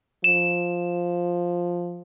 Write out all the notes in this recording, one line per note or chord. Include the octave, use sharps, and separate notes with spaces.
F3 E7